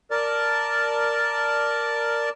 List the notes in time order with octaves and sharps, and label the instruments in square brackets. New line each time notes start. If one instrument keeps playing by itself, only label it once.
[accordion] A#4 D5 A5